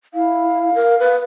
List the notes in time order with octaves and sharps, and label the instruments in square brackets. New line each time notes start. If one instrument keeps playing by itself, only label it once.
[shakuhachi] E4 [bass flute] F5
[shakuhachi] A#4
B4